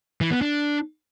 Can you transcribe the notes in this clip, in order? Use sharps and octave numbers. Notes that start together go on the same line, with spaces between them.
E3
B3
D4